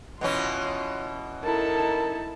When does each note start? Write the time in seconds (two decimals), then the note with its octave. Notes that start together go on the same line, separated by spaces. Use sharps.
0.21 B2 E3 C#4 F4 C6
1.44 D#4 E4 A4 A#4 A5